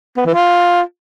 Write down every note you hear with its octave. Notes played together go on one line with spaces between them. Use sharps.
B3
E3
F4